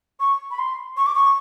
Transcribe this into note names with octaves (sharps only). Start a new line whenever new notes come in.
C#6
B5
C6
C#6
D6
C#6